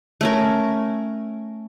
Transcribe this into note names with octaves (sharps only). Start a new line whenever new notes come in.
A3 C#4 A#4